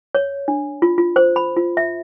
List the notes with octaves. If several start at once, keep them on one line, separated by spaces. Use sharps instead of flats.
C#5
D4
F4
F4
C5
B5
F4
E5